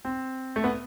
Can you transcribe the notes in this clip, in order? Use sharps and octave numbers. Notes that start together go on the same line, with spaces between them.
C4
A3
B3